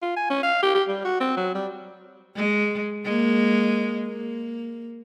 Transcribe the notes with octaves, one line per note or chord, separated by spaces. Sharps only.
F4
G#5
C#4
F5
G4
G4
G3
F#4
C4
F#3
G3
G#3
G#3 A#3
A#3